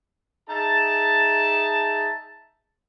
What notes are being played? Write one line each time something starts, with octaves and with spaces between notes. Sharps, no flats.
D#4 G#4 E5 A5